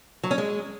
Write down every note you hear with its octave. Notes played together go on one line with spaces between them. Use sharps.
F#3
C#4
G#3